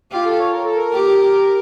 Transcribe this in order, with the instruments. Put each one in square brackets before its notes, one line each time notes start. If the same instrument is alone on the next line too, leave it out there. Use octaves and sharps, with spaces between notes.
[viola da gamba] F4 [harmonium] G4
[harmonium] A4
C#5
A#4
A4
A#4
[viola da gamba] G4